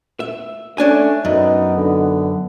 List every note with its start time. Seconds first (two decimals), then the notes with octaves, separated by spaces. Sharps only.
0.20 E5
0.78 A3 C#4 D4 G#5
1.25 F#2 B3 D#4
1.77 D3